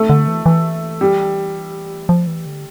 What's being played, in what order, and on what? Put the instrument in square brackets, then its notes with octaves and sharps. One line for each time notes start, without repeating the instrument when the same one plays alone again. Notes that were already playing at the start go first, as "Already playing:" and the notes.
Already playing: [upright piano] A3
[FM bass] D3
E3
E3
[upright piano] G3
[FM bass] F3
E3
D3